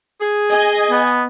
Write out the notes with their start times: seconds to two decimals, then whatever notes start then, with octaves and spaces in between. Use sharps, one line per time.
0.20 G#4
0.49 D#5 G#5
0.91 B3